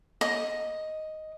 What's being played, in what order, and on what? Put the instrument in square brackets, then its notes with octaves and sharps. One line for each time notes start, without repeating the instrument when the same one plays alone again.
[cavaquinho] D#5